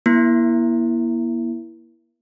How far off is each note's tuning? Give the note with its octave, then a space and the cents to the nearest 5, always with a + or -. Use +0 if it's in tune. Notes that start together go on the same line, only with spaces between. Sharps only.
A#3 +40 E4 +0